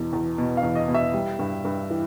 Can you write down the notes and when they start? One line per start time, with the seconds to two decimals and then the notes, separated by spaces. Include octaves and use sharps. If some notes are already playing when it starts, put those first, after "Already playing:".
Already playing: E2 B2
0.13 E2
0.38 B2
0.57 F5
0.63 E2
0.75 D#5
0.88 B2
0.95 E5
1.14 G3
1.39 G2
1.65 G2
1.90 E3